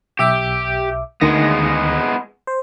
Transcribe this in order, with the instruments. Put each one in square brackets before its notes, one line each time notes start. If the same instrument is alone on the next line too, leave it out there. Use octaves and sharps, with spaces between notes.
[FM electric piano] B1 E5 D6 [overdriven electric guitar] G4
[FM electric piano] D2 D#3 A#6 [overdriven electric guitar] G#3 B3
[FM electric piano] C5